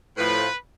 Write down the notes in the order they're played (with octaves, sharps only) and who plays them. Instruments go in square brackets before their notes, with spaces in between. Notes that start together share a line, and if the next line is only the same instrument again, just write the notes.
[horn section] A2 F3 B4